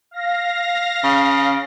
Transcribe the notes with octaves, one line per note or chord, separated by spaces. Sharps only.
F5 A#6
C#3